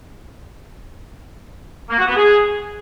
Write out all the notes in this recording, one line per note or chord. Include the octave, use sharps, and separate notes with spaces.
A#3
F#4
B3
G#4